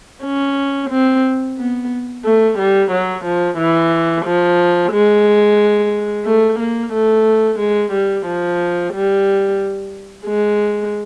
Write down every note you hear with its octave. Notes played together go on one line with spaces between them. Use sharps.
C#4
C4
B3
A3
G3
F#3
F3
E3
F3
G#3
A3
A#3
A3
G#3
G3
F3
G3
G#3